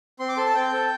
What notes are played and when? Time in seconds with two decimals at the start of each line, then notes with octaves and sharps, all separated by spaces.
0.19 C4 C6
0.29 D6
0.37 A4 C6
0.46 A5
0.55 C4 G5
0.73 A4